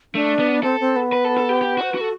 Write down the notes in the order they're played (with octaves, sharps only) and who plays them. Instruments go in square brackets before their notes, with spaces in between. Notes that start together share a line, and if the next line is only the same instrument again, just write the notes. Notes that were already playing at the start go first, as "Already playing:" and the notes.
[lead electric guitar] A3 [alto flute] D4
[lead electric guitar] B3
[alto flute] C4 [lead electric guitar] A4
[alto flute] C4
B3
[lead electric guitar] B4
A4
A4
G4
G4
[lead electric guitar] F#4 [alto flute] C5
[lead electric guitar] F#4 [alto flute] B4
[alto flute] A4